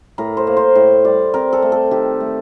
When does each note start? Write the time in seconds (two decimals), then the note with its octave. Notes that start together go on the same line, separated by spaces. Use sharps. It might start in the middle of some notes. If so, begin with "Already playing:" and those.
0.18 A2 A#4
0.37 C5
0.47 A#3
0.57 C5
0.76 A2
1.04 G3 D5
1.34 C4 A#4
1.53 A4
1.62 A3
1.72 A4
1.91 D#3 G4
2.20 A3